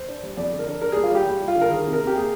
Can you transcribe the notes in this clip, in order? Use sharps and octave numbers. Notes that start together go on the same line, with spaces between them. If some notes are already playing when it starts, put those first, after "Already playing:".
Already playing: C5
D4
G3
F2 D5
D3
A#4
D4
D4 A#4
G3 G#4
F4
G3 G4
G3 G4
G3
F4
D3
A#4
D#3 G#4
C3
A#4
C3
G4
A#3 G#4